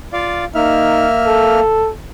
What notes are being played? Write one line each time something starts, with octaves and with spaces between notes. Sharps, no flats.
F4 D5 F5
A#3 D#4 E5 F6
A4